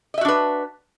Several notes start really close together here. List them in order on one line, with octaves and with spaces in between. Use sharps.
D#5 E5 F#4 D4 B4